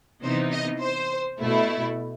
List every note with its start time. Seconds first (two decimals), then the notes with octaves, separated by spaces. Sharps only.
0.23 C3 E3 B3 D#4 C5
0.52 D#5
0.82 C5
1.40 B2 A3 E4